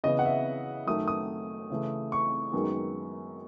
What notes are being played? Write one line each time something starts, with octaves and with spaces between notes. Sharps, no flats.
C#3 E3 B3 D#5
F#5
E5
F#2 D#3 A3 D#6
D#6
C#3 E3 A3
C#6
F#2 D#3 G#3 B3